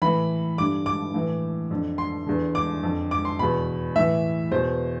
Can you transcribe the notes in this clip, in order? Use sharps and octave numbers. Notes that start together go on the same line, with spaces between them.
A2 E3 B5
G2 D3 D6
D6
A2 E3
F2 D3
C6
E2 D3
D6
F2 D3
D6
C6
E2 B2 B5
A2 E3 E5
E2 B2 C5